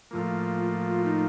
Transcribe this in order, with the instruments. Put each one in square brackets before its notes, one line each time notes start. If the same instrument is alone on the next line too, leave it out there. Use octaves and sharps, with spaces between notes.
[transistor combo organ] A2 F3 A#3 [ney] F4
[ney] F4
D#4